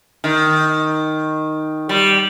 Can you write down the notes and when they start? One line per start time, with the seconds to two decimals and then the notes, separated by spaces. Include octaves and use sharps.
0.24 D#3
1.89 G3